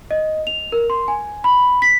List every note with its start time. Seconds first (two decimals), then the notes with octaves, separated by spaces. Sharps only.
0.11 D#5
0.47 F7
0.72 A#4
0.90 C6
1.08 G#5
1.44 B5
1.82 B6